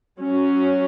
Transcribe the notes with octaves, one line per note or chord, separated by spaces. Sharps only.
F#3 C#4